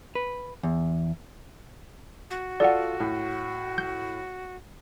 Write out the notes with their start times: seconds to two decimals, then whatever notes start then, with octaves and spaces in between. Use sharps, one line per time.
0.15 B4
0.63 E2
2.30 F#4
2.60 F4 A4 D5 F#5
3.00 A2
3.78 G6